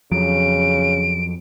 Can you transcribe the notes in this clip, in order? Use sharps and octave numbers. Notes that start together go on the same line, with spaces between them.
F2 C#3 F3 F#3 D7